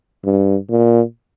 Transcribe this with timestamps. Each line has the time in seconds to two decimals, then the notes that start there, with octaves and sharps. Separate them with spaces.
0.25 G2
0.70 A#2